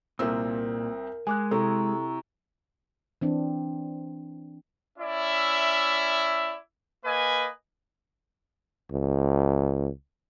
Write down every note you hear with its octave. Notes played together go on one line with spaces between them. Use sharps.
C2 A#2 C4 A#4 E6
G#3 G#5 D6 F#6
C3 E4 A4 A#5 C#6
E3 C4 D4
C#4 E4 D5 E5
A#3 B4 D#5 G#5
C#2